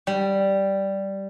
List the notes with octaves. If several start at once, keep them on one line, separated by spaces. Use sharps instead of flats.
G3